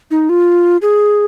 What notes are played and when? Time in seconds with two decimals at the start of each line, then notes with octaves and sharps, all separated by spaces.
0.11 D#4
0.29 F4
0.82 G#4